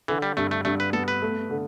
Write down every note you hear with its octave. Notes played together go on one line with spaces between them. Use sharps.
D3 E3
G3
G2 A3
A3
G2 A3
B4
B3 A4
B4
A3
D3